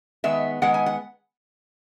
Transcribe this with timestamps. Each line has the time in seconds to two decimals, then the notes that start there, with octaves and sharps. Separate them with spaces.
0.24 D#3 G#3 B3 E5
0.62 D#3 G#3 B3 F#5
0.74 G#5
0.86 F#5